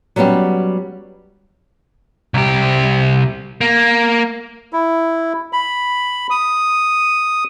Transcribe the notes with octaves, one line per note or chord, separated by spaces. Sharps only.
F#3 G3 B3 C#4 G4
C2 G4
A#3
E4
B5
D#6